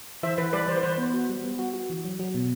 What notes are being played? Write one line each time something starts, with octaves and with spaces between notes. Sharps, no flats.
E3 C5 E5
E3 B4
G3 B4 D5
E3 C5
B4
E3 C5
B3
F#4
G3
B3
F#4
F#4
E3
F#3
F#3
B2